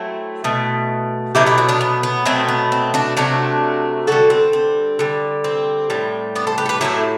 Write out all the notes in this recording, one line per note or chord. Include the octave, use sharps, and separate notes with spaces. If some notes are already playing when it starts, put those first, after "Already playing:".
Already playing: F#3 A3 C4 E4
B2 A3
B2 F#3 A3 E4 G4
E4 G4
D4 F#4
B3 D4
B3
B3
B2 F#3 A3 C4
B3
C4
D4 F#4
C3 F#3 A3 D4 F#4
D3 G3 F#4 A4
C4
C4
D3 G3
C4
A2 G3
B3 D4
A4 C5
G4 B4
A4
G4 B4
A2 F#3 A3 E4 G4